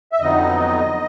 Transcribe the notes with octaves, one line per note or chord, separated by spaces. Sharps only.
E5
F2 D3 F#3 B3 D#4 D#5